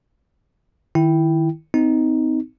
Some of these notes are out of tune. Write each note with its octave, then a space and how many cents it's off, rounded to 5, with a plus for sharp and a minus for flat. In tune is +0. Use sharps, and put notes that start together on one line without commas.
D#3 +0 E4 +0 G5 +0
C4 -30 D#4 +10